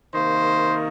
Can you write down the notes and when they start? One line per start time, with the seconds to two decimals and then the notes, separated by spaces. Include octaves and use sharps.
0.13 C3 D#3 A#3 C5